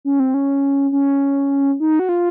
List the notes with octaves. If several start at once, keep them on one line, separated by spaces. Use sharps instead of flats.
C#4
C4
C#4
C#4
D#4
F#4
F4